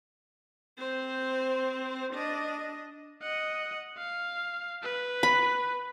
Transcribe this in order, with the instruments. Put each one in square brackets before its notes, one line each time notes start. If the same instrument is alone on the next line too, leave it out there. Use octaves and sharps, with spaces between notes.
[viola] C4 C5
D4 D#5
[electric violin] D#5 F#5
F5
B4
[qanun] B5